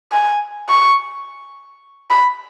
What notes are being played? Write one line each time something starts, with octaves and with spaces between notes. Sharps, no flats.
G#5
C#6
B5